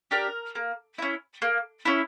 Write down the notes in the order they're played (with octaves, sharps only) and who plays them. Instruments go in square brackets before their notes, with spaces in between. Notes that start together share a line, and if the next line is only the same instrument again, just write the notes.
[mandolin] D4 G4 A#4
A#3
C#4 E4
A#3
C#4 E4